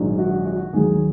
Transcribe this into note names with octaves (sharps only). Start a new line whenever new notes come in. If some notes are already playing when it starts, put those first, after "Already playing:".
Already playing: A#1 G#2 D#3 F#3
F#4
F#4
D#2 D#3 F#3 G#4